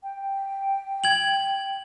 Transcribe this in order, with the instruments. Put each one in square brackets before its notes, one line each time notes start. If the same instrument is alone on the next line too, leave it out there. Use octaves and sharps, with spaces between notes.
[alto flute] G5
[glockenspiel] G#6 F#7